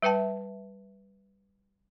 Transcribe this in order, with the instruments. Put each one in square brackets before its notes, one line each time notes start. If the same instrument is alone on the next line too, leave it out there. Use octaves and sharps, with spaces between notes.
[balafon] G3 B4 E5 G5 A5